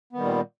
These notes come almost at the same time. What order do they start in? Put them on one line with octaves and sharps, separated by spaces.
B3 D#3 G3 A#2